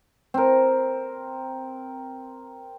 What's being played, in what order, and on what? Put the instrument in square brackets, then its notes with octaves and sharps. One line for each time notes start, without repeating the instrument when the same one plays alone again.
[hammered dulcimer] C4 A#4